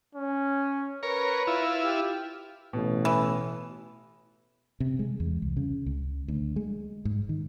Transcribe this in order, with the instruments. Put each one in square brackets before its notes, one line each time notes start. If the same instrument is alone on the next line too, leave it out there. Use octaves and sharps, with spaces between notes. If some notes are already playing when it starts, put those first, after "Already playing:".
[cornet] C#4
[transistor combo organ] A#4 C#5 [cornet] B4
[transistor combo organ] E4 F4
[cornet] G4
[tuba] A1 [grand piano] B2
[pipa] E3
[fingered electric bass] C3
G#3
E2
C2
C#3
C#2
D2
G#3
G#2
D#3